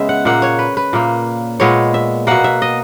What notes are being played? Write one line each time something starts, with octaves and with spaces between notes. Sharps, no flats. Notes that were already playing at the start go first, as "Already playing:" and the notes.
Already playing: C#3 G#3 B3 E5
F#5
A#2 A#3 F#5
C#5
B4
B4
A#2 A#3
A#2 G#3 B3 C#5
E5
B2 A#3 F#5
E5
D#5